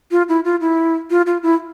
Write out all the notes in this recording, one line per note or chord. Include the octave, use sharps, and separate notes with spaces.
F4
E4
F4
E4
F4
F4
E4